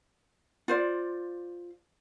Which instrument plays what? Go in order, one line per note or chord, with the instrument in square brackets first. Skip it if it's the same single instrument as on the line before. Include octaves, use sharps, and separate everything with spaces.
[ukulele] F4 C5 D5